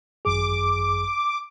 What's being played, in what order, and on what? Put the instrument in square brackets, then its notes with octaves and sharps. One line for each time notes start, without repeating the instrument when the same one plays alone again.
[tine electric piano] G#1 F#2 G#4 [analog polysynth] D6